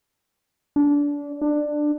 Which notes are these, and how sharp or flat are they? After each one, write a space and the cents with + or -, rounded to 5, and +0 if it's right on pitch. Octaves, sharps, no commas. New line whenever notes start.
D4 -25
D4 +15